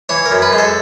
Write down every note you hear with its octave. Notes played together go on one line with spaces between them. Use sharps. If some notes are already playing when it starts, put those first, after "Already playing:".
E3 C#5
A#4
F#2
B4
G#3
A4